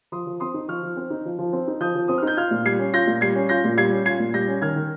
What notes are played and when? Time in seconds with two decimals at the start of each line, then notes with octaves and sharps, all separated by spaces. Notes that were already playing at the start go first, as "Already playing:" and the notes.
0.12 F3 C6 D#6
0.27 F3
0.40 C4 C6 D#6
0.54 D#4
0.68 F3 C#6 F6
0.83 F3
0.97 C4
1.10 D#4
1.25 F3
1.39 F3
1.53 C4
1.68 D#4
1.80 F3 D#6 G6
1.95 F3
2.08 C4 D#6
2.18 F6
2.23 D#4 G6
2.37 F4 F6 G#6
2.51 A#2
2.65 G3 G#6 C7
2.79 C#4
2.94 F4 G6 A#6
3.07 A#2
3.21 G3 G#6 C7
3.35 C#4
3.49 F4 G6 A#6
3.64 A#2
3.77 G3 G#6 C7
3.92 C#4
4.06 F4 G#6 C7
4.19 A#2
4.34 G3 G6 A#6
4.48 C#4
4.62 D#3 F6 G#6
4.76 D#3